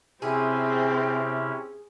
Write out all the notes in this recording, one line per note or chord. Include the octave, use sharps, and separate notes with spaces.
C3 C4 C#4 E4 G#4